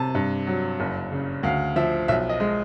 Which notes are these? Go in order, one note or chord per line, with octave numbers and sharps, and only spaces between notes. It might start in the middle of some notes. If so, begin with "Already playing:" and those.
Already playing: C3 A5
G2
F#3
F#1
C#3
D2 F5
F3 E5
B1 E5
D#5
G#3